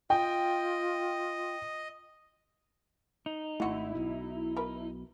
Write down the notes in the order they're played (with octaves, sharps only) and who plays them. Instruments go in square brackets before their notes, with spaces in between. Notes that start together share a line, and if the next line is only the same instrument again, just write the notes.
[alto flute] F4 [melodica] D#5 [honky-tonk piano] G5
[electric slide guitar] D#4
[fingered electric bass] G#1 A3 [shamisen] D3 F#4 [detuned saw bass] E4
[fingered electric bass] B1 B2
[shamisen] A#4 B4